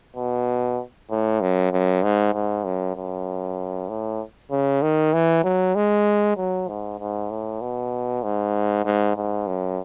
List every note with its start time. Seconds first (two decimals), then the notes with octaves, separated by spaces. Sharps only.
0.16 B2
1.10 A2
1.41 F#2
1.72 F#2
2.03 G#2
2.35 G#2
2.65 F#2
2.96 F#2
3.89 A2
4.51 C#3
4.82 D#3
5.14 E3
5.44 F#3
5.76 G#3
6.37 F#3
6.69 G#2
7.00 G#2
7.30 A2
7.61 B2
8.23 G#2
8.85 G#2
9.16 G#2
9.47 F#2